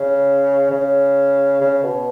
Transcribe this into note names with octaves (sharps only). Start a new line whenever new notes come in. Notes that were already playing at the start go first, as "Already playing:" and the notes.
Already playing: C#3
C#3
C#3
B2